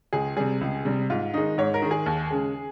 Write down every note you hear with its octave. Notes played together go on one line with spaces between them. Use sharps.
C#2 G#4
C3 G3 G#4
C#2
C3 G3
G#2 F4
D#3 G#3 D#4
G#2 C#5
A#4
D#3 G#3
G#4
D#2
C#3 G#3